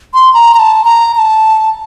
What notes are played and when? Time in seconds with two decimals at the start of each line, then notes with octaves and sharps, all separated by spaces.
0.14 C6
0.34 A#5
0.54 A#5
0.59 A5
0.85 A#5
1.15 A#5
1.19 A5